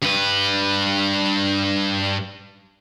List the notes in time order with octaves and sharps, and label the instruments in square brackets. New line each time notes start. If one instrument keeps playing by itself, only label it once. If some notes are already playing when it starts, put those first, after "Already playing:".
[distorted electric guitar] G2 B4